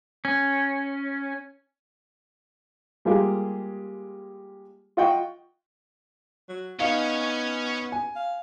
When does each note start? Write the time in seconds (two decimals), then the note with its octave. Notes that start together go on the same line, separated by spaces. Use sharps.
0.25 C#4
3.05 G3 G#3 A#3 F4 G4 G#4
4.97 F4 D#5 F#5 G5 C#6
6.49 F#3
6.79 B3 C#4 D#4 C#5 F5
7.92 G#5
8.15 F5